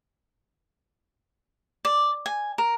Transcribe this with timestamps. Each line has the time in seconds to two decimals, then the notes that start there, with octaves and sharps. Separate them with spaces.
1.85 D5
2.26 G#5
2.58 A#4